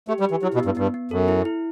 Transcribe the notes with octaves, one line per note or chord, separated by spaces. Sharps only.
A3 G4
G3
G4
E3
F#3 E4
B2
B3
G2
G2 B3
B3
F#2 A4
E4
E4